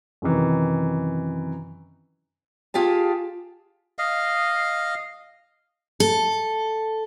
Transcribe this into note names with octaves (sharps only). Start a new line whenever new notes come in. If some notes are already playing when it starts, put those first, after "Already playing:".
F#2 C3 D#3 E3
F4 G4 G#4 A5
D#5 F5
A4